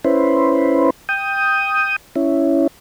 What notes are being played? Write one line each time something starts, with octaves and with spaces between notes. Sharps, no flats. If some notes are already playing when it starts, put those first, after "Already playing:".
C#4 E4 B4 C5
G5 D#6
C#4 E4